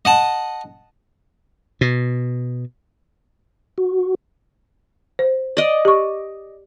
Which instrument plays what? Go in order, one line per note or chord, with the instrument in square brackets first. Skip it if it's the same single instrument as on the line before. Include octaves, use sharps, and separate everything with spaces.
[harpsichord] D#5 F#5 A5
[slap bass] B2
[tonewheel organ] F#4
[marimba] C5
[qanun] D5 D#5
[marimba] G4 C#6